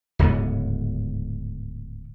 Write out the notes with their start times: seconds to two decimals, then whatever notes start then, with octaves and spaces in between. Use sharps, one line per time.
0.19 D1 C#2 G#2 B3